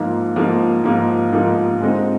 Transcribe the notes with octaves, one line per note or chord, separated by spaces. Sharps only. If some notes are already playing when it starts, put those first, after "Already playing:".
Already playing: G#2 F3 A#3 D#4
G#2 F3 A#3 D#4
G#2 F3 A#3 D#4
G#2 F3 A#3 D#4
D3 G#3 C4 D#4